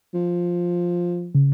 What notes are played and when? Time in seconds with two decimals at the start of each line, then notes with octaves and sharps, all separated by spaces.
0.14 F3
1.35 C#3